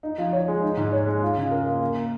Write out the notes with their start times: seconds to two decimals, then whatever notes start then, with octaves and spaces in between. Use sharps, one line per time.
0.03 D#4
0.18 F3
0.33 C#5
0.48 G#3
0.63 D#4
0.77 G#2
0.92 C#5
1.07 G#3
1.22 F4
1.37 C#3
1.51 A#4
1.66 A#3
1.81 A#3